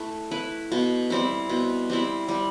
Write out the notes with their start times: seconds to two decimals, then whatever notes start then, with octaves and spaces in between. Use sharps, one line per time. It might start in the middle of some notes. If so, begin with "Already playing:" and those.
Already playing: A3 E4 B4
0.31 E4 B4
0.72 B2
1.10 G3 C4 E4
1.49 B2
1.90 G3 C4 E4
2.29 G3